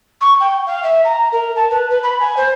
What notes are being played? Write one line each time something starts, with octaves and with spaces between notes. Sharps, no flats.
C#6
G5
F5
E5
A#5
A#4
A5
B4
B4
B5
G#5
C5